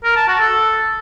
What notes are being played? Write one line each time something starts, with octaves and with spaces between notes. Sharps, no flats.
A#4
A5
F#4
A4